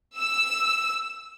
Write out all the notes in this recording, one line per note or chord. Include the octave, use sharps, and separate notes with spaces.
E6